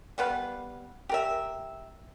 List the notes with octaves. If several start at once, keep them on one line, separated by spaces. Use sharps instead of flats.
G3 B3 B4 F5
G4 A#4 E5